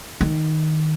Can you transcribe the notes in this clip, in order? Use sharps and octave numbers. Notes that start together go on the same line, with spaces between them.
D#3